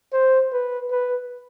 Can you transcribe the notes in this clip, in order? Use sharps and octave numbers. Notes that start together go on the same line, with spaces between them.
C5
B4
B4